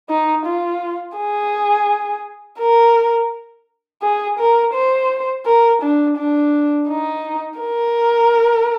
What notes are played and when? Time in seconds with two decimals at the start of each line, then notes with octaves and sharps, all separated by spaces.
0.10 D#4
0.46 F4
1.17 G#4
2.60 A#4
4.02 G#4
4.39 A#4
4.74 C5
5.45 A#4
5.82 D4
6.17 D4
6.88 D#4
7.60 A#4